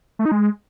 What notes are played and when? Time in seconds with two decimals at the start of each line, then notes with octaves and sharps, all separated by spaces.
0.19 A3
0.25 D#4
0.32 G#3